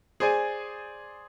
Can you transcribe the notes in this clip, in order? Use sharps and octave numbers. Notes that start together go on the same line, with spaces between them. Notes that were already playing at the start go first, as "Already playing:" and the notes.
G#4 C5 D5 G#5